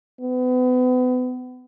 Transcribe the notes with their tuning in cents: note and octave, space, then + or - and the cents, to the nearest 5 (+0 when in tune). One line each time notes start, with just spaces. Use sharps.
B3 +35